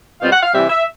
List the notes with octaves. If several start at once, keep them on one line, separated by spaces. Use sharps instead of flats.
B2 G3 C4 F4 F5
F#5
F5
C3 E3 G3 C4 E5
E5